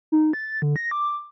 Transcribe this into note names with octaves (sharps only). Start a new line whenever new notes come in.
D#4
A6
D3
A#6
D6